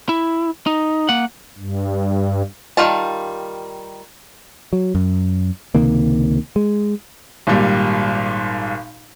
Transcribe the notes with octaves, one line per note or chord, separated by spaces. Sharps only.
E4
D#4
A#3 F#5
G2
D#3 G3 F4 A5
F#3
F#2
C#2 C3 D#3 A#3
G#3
G#1 A#2 G3